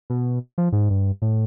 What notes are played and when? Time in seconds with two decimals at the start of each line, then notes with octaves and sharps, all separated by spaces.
0.10 B2
0.58 F3
0.72 G#2
0.90 G2
1.22 A2